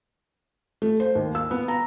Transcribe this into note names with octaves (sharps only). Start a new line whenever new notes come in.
A3
C5
D#2
E6
B3
A#5